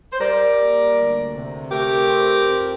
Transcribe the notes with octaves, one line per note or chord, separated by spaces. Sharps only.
C5
G3 A#4 D5
A#3
D2
C3
A3 G4 A#4
C4
F2